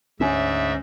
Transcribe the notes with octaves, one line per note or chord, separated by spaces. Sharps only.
D2 G#2 C#4 E5